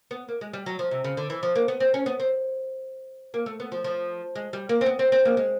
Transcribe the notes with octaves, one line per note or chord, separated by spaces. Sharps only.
B3
A#3
G#3
G3
F#3
F3
C3
C#3
D3
E3
F3
A#3
B3
C4
C#4
B3
C4
A#3
A3
B3
F3
F3
G#3
G3
A#3
C4
B3
C4
C4
A#3
G#3